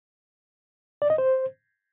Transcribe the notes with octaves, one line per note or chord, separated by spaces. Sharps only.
D5
D#5
C5